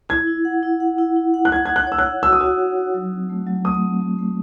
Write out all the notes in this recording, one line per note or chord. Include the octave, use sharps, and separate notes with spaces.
E4 G#6
E4
F#5
E4
F#5
E4
E4
F#5
F#6
D#4 G#6
D#4 G#6
F#6
C#5 E6
F#6
F#5
F#4 E6
D#6
F#4 E6
F#4
D#4
F#3
C4
A3
F#3
A3 D#6
C4
F#3
A3